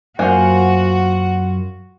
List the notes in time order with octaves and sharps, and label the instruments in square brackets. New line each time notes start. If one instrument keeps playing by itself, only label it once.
[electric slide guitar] F#2 F4 [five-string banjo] A#3 C5 G#5 [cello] F#4 [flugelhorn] F#5